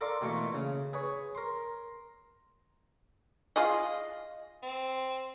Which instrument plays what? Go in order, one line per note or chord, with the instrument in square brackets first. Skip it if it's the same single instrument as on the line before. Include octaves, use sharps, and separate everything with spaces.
[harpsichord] A4 A#4 D5 F5 C6 D6
B2 E3 A3 A#3 F4 C#6
C#3
G#4 B4 C#5
A#4 C6
[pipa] F4 G#4 D#5
[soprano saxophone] C4